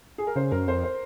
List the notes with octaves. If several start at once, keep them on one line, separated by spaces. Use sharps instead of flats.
G#4
A#4
C#3 C5
F#2 A#4
F2 C5
C5